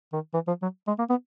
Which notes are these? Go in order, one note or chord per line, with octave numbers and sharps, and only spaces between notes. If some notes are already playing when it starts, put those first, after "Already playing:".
D#3
E3
F3
F#3
G#3
A#3
B3